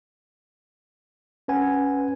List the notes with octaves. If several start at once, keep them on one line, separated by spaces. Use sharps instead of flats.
C#4 B4 F#5 G#5